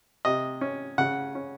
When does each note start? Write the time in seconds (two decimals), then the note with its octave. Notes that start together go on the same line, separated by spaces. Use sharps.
0.25 C3 D#5
0.61 C#4
0.98 C#3 F#5
1.35 C#4